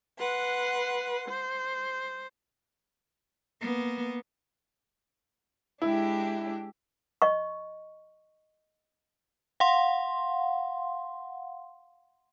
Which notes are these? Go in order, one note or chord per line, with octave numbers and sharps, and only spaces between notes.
B4 F#5 C6
C5
A#3 B3
G#3 D4 E4 G4
D#5 C#6
F5 F#5 C6